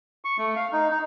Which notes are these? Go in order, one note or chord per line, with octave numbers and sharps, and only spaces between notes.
C#6
A3
F5
D#4
D#4